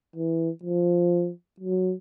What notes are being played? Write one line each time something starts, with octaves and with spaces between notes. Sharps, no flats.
E3
F3
F#3